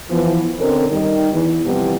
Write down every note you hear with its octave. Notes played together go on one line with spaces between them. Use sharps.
E3 F3 B3
B2 D3 C4 C#4 A4 A#4
D#3 G3 D#4
E2 E3
C3 E3 F3 G3 B3